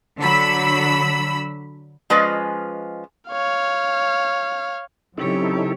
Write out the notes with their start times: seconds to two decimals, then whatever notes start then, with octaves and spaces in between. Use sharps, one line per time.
0.20 D3 F#3 B5 E6
2.10 F3 G#3 C#4 F4 B4 D#5
3.30 C#5 F5
5.18 C#3 F#3 C4 D#4 E4 G4 A4 C#5